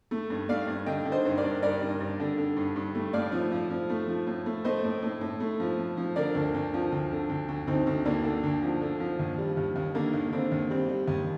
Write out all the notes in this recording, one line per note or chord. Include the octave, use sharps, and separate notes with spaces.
A3
G2
A3 D5 F5
G2
D3 D#5 G5
D3
C5 D#5
G2
A#4 D5
G2
G2 A#4 D5
G2
G2
D3
D3
G2
G2
A3
A2 D5 F5
F3
F3
F3
A3
F3
A2
A3
A3 C5 D#5
A2
A2
A2
A3
F3
F3
F3
D3 A#4 D5
D2
D2
F3
D2
D3
D2
D2
D2 C4 D#4
D2
D2 A#3 D4
D3
D2
F3
D3
F3
D#2
G3
D#2
D#2
D3 A#3
D#2
D3 C4
D#2
G3 C4
G3
D#2